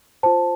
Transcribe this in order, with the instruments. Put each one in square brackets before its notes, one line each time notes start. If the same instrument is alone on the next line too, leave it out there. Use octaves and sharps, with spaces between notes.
[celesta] F4 C5 A5